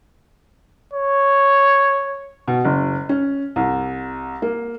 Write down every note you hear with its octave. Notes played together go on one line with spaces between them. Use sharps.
C#5
B2
F#1
C#4
C2
A#3